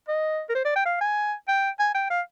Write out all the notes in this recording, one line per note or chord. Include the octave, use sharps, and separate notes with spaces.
D#5
A#4
C5
D5
G5
F5
G#5
G5
G#5
G5
F5